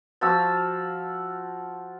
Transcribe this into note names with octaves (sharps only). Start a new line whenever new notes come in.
F3 F4 F#4 E6